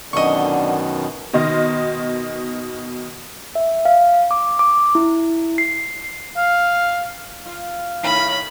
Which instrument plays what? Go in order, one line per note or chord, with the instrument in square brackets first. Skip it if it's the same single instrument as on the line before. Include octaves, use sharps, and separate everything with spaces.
[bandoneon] F#2 B2 D#3 [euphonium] D3 [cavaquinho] D#5 C#6
[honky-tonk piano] B2 D#3 D#5 C6 F6
[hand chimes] E5
F5
D6
D6
E4
C7
[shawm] F5
[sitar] F4
[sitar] A2 D#3 [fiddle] B5